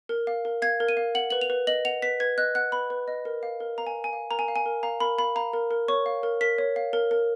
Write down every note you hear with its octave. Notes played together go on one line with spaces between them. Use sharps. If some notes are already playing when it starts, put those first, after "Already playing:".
A#4
F5
A#4
F5 G#6
A#4
D#7
F5
F#5 F#7
B4 F#7
F7
B4
D#5 F#7
F#5 F7
B4 B6
B4 G#6
D#5 F#6
F#5 F#6
B4 B5
B4
D#5
A#4
F5
A#4
F5 A#5
G#5
A#4
G#5
F5
A#4 A#5
G#5
F5
G#5
A#4
F5 A#5
A#4 B5
F5 B5
F5 A#5
A#4
A#4
C#5 C#6
F5
A#4
A#4 B6
C#5
F5
A#4
A#4